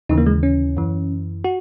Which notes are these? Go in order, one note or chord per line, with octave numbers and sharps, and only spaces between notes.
D#2 C#3 E3 D#4
A#3
G#3
C#4
F#2 E3
F#4